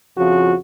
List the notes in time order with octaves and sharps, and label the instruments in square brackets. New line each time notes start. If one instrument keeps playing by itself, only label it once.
[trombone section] F2 C#3 F3 F#4